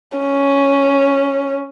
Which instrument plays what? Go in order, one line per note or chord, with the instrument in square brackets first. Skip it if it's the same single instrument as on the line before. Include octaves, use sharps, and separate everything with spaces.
[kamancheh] C#4